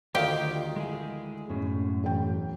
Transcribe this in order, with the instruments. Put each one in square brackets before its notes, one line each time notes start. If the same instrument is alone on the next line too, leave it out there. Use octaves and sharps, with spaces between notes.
[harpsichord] D2 D#3 [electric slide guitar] F4 [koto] G4 [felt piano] D#5 F5 A#5
[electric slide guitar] G#3 E4 G#4
[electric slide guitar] F#2 A2 [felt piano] C#4
[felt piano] E1 G5